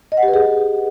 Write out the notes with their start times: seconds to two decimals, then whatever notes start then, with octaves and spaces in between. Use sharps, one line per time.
0.12 D#5
0.17 F#5
0.23 G4
0.28 B4
0.34 G#4